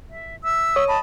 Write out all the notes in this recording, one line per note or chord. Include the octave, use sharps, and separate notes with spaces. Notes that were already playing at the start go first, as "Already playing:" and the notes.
E5
E5 E6
C#5 D#6
D#5 A5 B5